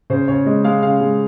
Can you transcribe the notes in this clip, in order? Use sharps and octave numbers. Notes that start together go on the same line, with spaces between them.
C#3 C5
C#3 C#5
G#3 D#5
G#3 F5
C#3 F5
G#3